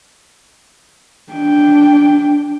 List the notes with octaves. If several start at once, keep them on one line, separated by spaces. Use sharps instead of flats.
D4 G5